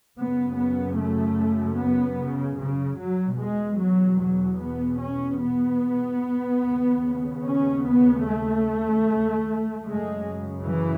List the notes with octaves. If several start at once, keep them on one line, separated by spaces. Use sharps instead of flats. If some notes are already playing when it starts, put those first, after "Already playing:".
F#2 C#3 B3
B3
A3
B3
C#3
C#3
F#3
E2 B2 G#3
F#3
F#3
B3
C#4
B3
D#2 C#3
C#4
B3
A3
F#2 C#3 G#3
E3